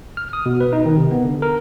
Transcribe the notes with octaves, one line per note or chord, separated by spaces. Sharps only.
F6
D#6
B2
B4
D#4
D#3
C3
B3
D3
A#4